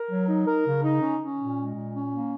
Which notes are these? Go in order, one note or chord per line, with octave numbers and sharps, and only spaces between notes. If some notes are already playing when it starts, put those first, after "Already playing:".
Already playing: A#4
F#3
D#4
A#4
C#3
D#4
C#4
C#4
A#2
G#3
A#2
C#4
A#3